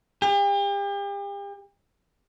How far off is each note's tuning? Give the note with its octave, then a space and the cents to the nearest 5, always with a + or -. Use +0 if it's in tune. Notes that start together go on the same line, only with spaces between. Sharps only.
G4 +40